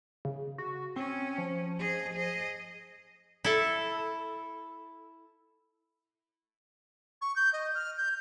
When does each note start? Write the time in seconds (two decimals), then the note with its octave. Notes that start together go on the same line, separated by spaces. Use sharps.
0.25 C#3
0.58 F#4
0.96 C4 C#4
1.38 F3
1.79 G#4 D#5
2.14 G#4 D#5
3.44 E4 A4
7.22 C#6
7.36 G6
7.53 D#5
7.75 F6
7.97 G6